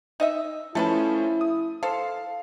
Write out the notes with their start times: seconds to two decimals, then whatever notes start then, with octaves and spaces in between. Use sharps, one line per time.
0.20 D#4 D#5 E5
0.75 F3 A3 C#4 E4 A4 B4 A5
1.41 D#6
1.83 A4 C5 F5